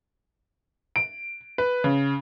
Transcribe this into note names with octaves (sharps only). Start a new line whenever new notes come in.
D7
B4
C#3